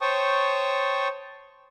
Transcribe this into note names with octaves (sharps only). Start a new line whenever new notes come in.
C5 C#5 G5 A5 C#6 D#6